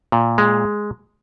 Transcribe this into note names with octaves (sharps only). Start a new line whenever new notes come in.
A#2
G#3